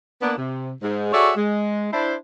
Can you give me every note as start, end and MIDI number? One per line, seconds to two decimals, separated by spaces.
0.22 0.33 58
0.22 0.33 59
0.22 0.33 62
0.37 0.71 48
0.83 1.10 44
1.13 1.32 66
1.13 1.32 68
1.13 1.32 69
1.13 1.32 73
1.13 1.32 74
1.13 1.32 76
1.36 1.88 56
1.93 2.14 62
1.93 2.14 64
1.93 2.14 72